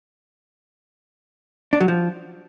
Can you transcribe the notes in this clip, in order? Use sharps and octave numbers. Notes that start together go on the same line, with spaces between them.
D4
F#3
F3